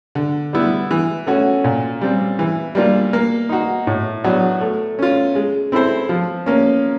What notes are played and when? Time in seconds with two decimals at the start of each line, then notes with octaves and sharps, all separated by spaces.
0.15 D3
0.53 G3 B3 E4
0.91 E3
1.27 A3 C#4 F#4
1.64 A#2
2.01 G3 C4
2.39 E3
2.75 G3 A#3 D4 F4
3.13 A#3
3.49 D#4 F#4
3.87 A2
4.24 F#3 B3 D4 F#4
4.61 A3
4.99 C#4 F4
5.35 G#3
5.72 C4 E4 A4 C5
6.09 F3
6.46 A#3 C#4